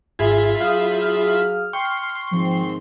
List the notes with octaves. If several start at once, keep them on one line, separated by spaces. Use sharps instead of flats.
G#1 F4 G#4 E5 B5 G#6
F#3 G#4 F5 D#6 G6
F6
G5 C6 C#6
G#2 D#3 F3 C4